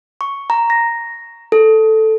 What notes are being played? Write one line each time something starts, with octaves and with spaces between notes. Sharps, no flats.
C#6
A#5
A#6
A4